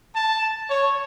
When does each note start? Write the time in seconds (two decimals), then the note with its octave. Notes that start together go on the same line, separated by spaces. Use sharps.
0.13 A5
0.70 C#5